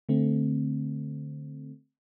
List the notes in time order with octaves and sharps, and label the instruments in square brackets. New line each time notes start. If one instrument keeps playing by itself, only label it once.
[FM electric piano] D3 A3 C4